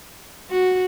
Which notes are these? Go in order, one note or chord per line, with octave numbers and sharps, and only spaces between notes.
F#4